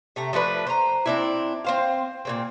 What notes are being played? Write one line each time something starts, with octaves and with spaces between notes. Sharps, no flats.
C3 A3 A#5
F3 A3 D4 B4
C5 A#5
C4 D4 E4
C4 C5 F5
A#2 C#3 C4